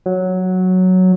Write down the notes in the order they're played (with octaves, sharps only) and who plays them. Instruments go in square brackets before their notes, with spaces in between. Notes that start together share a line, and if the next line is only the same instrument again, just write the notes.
[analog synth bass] F#3